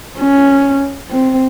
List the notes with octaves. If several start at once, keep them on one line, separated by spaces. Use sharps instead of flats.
C#4
C4